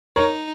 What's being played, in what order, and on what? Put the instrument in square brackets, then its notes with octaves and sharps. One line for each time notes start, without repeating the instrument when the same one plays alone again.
[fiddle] D#4 [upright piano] A#4 C#5